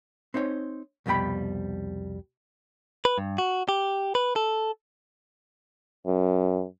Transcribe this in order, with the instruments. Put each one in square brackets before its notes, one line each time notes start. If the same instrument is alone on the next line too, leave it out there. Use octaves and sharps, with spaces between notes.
[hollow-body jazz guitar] C4 D#4 C5 C#5
C2 F2 B2 G3 G5 B5
[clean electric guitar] B4
G2
F#4
G4
B4
A4
[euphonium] F#2